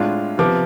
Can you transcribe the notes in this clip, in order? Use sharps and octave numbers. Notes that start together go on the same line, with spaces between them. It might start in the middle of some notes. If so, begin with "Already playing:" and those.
Already playing: A2 G#3 D4 F4
C3 F3 B3 D6